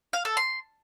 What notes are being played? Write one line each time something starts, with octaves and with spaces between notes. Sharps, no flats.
F5
A4
C6